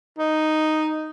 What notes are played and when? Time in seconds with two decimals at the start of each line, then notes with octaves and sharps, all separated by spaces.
0.18 D#4